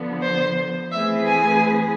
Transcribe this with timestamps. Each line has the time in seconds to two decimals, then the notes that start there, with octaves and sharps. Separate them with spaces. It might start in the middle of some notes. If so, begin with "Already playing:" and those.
Already playing: D3 F3 B3
0.22 C5
0.92 E3 A3 C4 G#4 B4 E5
1.26 G#5